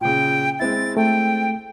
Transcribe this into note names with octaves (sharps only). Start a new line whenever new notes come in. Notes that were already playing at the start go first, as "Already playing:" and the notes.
A#2 C#3 G5
G#3 C4 E4 A6
A3 G5